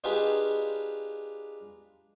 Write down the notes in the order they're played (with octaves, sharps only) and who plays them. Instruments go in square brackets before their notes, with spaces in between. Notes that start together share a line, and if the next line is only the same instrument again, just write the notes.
[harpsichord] D4 D#4 F4 G4 G#4 B4